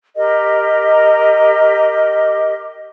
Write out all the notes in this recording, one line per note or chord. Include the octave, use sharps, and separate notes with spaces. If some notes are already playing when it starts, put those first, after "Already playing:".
G4 A#4 D#5